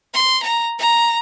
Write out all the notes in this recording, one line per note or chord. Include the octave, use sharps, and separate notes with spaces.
C6
A#5
A#5